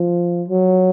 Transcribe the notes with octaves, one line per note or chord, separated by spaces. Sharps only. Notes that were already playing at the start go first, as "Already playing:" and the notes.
Already playing: F3
F#3